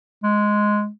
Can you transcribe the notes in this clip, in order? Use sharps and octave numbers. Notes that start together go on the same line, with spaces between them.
G#3